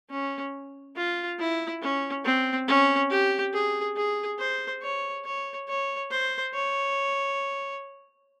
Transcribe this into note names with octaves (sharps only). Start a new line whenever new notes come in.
C#4
F4
E4
C#4
C4
C#4
G4
G#4
G#4
C5
C#5
C#5
C#5
C5
C#5